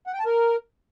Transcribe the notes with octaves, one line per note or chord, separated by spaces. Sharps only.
F#5
G5
A5
A#4